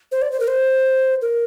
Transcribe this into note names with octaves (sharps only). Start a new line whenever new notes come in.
C5
D5
C5
A#4
C5
A#4